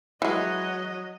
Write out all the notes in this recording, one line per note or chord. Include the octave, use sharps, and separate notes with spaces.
E3 F#3 G#3 D#5